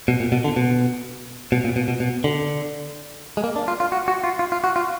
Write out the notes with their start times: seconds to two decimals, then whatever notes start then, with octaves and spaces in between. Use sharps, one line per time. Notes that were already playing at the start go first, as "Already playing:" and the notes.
0.08 B2
0.20 A#2
0.32 B2
0.44 D3
0.56 B2
1.52 B2
1.64 A#2
1.76 B2
1.88 B2
2.00 B2
2.24 D3
3.37 G#3
3.44 A#3
3.56 D4
3.68 F4
3.80 F4
3.92 F#4
4.08 F#4
4.24 F4
4.39 F4
4.52 F4
4.64 F#4
4.76 F4